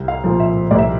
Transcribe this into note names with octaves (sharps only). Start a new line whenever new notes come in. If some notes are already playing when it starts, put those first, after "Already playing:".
Already playing: C2
F5
A#2 F3
E5
C2 D5
E5